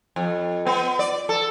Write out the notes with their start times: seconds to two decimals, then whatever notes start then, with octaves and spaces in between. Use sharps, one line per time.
0.16 F2
0.67 B3
0.99 D5
1.29 A4